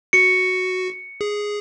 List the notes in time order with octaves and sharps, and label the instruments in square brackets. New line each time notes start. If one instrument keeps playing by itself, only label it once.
[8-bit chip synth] F#4 [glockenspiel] C#7
[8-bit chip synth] G#4